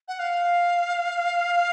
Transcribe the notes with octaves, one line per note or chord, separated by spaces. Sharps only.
F#5
F5